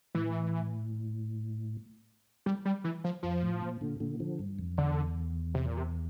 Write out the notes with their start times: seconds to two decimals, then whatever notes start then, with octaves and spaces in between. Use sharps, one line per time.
0.14 A2 E3
2.46 G3
2.65 G3
2.84 E3
3.04 F3
3.23 F2 F3
3.43 A2
3.62 A#2
3.81 A#2 D3
4.00 A#2 D3
4.20 D3 F3
4.39 G2
4.59 F2
4.78 E2 D3
5.54 C3
5.66 A#2
5.77 C3